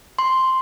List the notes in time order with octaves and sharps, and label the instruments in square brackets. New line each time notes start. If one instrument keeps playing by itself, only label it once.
[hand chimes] C6